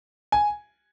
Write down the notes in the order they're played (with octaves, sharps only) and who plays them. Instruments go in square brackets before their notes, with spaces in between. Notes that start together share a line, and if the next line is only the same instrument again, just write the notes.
[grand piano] G#5